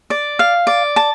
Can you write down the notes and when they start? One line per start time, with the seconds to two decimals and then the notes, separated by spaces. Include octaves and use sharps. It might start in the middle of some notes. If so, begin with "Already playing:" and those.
0.10 D5
0.39 F5
0.67 D5
0.96 A5